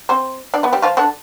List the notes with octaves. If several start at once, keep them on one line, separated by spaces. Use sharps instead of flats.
C4 C5
D4 D5
B3 B4
G3 G4
F3 F4
D3 D4